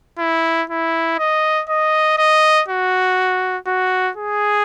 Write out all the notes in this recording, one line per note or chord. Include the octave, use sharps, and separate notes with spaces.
E4
E4
D#5
D#5
D#5
F#4
F#4
G#4